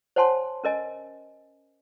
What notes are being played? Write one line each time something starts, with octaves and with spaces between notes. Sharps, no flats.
C5 C#5 F#5 G#5 A5 C6
C#4 A#4 D#5 G#5